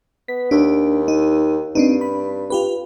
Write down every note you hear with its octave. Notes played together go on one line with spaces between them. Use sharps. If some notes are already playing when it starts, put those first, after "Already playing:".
B3 B6
D#2 D4
D#4
G2 C4 D4 D#4
B5
F4 G4 B4